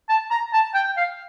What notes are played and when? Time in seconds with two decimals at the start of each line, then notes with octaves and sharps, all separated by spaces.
0.09 A5
0.31 A#5
0.53 A5
0.74 G5
0.97 F5